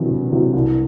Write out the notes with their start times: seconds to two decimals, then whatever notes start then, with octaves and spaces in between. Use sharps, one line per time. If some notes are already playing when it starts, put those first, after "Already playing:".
Already playing: E1 E2 C3 F#3
0.11 E1
0.32 E2 C3 F#3
0.54 C2